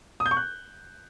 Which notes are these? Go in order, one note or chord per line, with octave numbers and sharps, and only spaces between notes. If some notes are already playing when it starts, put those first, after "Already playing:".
D#6
G6
C#6
F#6